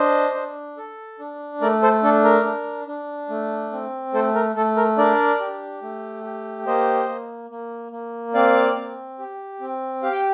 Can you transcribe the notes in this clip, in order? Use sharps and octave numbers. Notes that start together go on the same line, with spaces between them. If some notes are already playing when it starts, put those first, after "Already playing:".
Already playing: D4 C5 D#5
D4
A4
D4
A3 A#4 D5
A4 C5
D4 A4
A#4
D4
D4
A3
C4
A3 A4 C5
A#4
A3 A4
A#4
D4 A#4 D5
G4
A3
G4
A#3 C5 D#5
A#3
A#3
A#3
C4 D5 F5
C4
G4
C4
G4 F5
G5